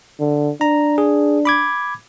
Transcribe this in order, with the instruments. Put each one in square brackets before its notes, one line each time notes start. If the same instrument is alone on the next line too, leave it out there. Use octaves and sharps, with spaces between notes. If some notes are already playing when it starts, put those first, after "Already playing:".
[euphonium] D3
[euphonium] D4 [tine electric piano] A#5
[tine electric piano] G#4
B5 D6 G#6